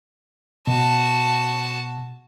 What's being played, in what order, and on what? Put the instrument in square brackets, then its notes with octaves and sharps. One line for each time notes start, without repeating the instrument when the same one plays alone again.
[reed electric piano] B2 [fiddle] F#4 A5